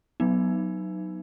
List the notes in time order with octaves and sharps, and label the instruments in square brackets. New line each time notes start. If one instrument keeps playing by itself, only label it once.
[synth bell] F#3 B3 D#4